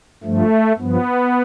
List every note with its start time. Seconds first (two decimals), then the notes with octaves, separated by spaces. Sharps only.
0.23 G2 F3 A3
0.78 G2 F3 B3